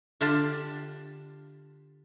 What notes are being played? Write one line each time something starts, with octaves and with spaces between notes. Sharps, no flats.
D3 D4 F4 G4 D5 A5